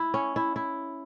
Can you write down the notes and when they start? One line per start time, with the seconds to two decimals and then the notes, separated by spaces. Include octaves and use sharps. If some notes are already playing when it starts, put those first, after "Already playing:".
Already playing: E4
0.14 C#4
0.36 E4
0.56 E4